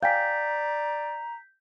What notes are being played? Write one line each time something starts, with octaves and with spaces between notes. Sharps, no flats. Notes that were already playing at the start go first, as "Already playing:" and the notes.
D5 F5 G5 G#5 A#5 G6 B6